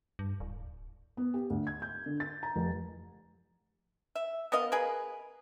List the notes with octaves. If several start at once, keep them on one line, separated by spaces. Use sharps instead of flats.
G2
D1
B3
G4
D2
G#6
G6
D3
A6
A#5
F1
E5
B3 A#4 D#5 F5
G#4 A#4 B4